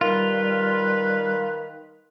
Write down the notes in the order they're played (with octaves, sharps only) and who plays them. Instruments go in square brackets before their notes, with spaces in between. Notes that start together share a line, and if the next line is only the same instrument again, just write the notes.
[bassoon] D#3 [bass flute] G3 [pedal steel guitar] F4 [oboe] B4